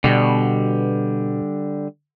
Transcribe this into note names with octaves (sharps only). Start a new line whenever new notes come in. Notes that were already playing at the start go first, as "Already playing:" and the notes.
B2 D3 G3